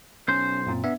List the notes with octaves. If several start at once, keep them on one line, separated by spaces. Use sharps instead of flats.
B1 C#4 C5
F#2 A#2 C4
B3 D4 E5